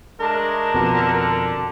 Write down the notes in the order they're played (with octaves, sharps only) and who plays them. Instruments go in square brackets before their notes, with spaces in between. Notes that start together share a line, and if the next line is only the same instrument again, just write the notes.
[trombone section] G#3 A3 D4 [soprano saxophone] A#4 [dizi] A5
[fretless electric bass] F2 B2 [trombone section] D3